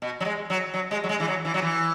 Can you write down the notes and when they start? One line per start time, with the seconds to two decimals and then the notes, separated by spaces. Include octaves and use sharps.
0.02 B2
0.20 F#3
0.25 G#3
0.50 F#3
0.74 F#3
0.91 G#3
1.04 F#3
1.09 G#3
1.20 E3
1.28 F#3
1.45 E3
1.54 F#3
1.62 E3